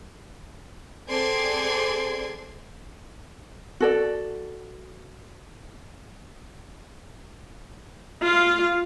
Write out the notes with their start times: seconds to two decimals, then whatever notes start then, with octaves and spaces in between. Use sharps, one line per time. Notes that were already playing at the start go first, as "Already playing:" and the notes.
1.08 C4 G#4 A4 D5 C6 G#6
3.80 F#4 A4 D5
8.22 F4 F5